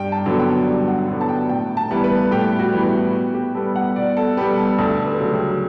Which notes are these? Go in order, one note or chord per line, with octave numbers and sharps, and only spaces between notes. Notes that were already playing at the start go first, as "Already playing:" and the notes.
Already playing: G2 G5
A5
D3 F#3 B3
G5
G2
F#5
D3 F#3 B3
A5
G5
A2 G5
A5
E3 G3 B3
B4
A2 G4
F#4
E3 G3 B3
G4
B2
G4
G3 B3 A4
F#5
B2 D5
A4
G3 B3 G4
A4
D2 A4
B4
C#3 F#3 A3
G4